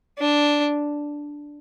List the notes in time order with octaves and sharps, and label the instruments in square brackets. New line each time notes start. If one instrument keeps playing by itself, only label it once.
[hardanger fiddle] D4